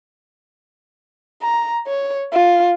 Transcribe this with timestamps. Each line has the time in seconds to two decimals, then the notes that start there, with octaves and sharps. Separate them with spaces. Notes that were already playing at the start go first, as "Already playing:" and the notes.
1.42 A#5
1.87 C#5
2.33 F4